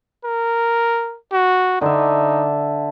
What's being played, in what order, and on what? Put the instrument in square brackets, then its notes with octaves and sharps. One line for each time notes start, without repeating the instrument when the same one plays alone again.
[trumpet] A#4
F#4
[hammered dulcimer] D3 E5 [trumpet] D#4